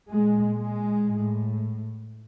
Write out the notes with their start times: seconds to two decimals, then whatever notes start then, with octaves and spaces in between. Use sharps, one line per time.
0.09 A#2 G#3
0.56 G#3
1.04 A2